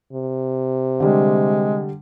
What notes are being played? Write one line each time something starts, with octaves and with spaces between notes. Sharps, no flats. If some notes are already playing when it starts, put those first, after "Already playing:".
C3
D3 G3 G#3